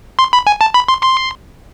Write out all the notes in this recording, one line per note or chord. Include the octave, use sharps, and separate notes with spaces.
C6
B5
G#5
A5
B5
C6
C6